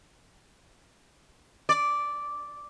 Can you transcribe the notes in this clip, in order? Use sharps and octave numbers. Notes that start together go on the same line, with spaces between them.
D5